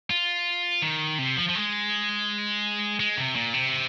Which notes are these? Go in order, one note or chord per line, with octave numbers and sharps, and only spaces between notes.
F4
D#3
C3
F3
F3
G#3
G#3
C3
A#2
C3